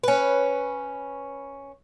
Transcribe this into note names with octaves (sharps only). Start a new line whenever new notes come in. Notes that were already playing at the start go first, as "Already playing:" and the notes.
C#4 B4